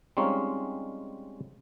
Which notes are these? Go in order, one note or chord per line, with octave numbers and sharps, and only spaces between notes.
G3 G#3 C4 C#4 D#4 F4